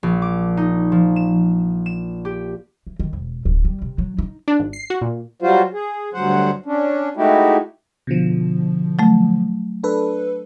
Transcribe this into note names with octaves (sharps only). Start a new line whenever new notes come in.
A#1
D6
D#4
F3
E7
E7
G4
E3
D#3
E1
D1
G3
C3
F#3
D#4
D4
G#1
C7
F#4
A#2
F#3 G3 F4 F#4 C5
G#4
D2 G2 F#3 C5 F#5
C#4 D4
G#3 A3 D#4 E4 F#4 G4
B2 D3 F3
F#3 A3
D4 A4 B4